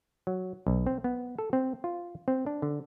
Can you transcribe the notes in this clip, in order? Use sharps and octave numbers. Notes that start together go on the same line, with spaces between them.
F#3
B1
C4
B3
A4
C4
F4
C4
D4
D3